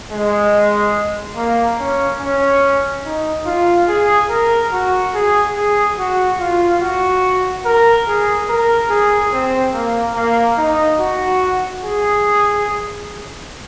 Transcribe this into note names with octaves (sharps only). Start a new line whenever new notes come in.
G#3
A#3
C#4
C#4
D#4
F4
G#4
A#4
F#4
G#4
G#4
F#4
F4
F#4
A#4
G#4
A#4
G#4
C4
A#3
A#3
D#4
F#4
G#4